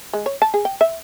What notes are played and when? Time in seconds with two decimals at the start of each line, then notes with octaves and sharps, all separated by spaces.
0.13 G#3
0.26 C#5
0.42 A5
0.54 G#4
0.65 G5
0.81 E5